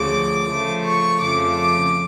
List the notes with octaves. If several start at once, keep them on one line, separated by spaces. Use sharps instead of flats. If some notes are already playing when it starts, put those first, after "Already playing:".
Already playing: D2 C#3 F3 D6
C#3 F3 A3
C#6
F2 C#3 F3 A3 D6
D6